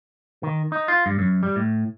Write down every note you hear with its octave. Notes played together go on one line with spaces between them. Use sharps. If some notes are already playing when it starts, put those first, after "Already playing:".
D#3
D#4
F4
G2
F#2
G3
A2